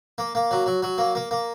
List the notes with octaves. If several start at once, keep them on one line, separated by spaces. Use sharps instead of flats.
A#3
A#3
F#3
F#3
F#3
A#3
A#3
A#3